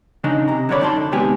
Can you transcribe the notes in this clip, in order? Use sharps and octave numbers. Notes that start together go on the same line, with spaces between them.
C#3 D4 D#4
C3 A#5
D3 F#3 G3 C#5 D5 B5
F#2 D#4 D5 A5 C6
D3
C3 D#3 G#3 B3 G4 G#4